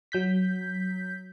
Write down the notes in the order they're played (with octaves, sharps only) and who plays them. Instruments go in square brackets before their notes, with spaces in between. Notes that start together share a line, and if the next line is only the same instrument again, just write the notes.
[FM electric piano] F#3 G6 B6